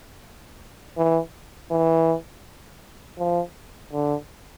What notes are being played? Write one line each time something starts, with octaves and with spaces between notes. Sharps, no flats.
E3
E3
F3
D3